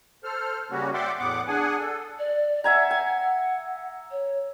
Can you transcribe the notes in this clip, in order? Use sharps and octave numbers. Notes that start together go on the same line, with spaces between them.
A4 C5 F6
C#3 G3 A#3 C#4 F#4
D5 E5 F#5 G5 C6 D6
E2 A2 B3 F#5 D6
D4 G#4 F#5 G#5
A4
D5
E5 F#5 G#5 A#5
G#5
C#5